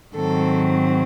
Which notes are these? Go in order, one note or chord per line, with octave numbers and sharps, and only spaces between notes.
G#2 D#3 F#3 C4 A4